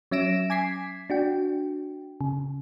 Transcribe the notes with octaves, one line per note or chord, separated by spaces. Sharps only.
F#3 C#4 E5 A#6 D7 E7
G#5 D6 G#6 B6 C7
D4 F#4 G5
C#3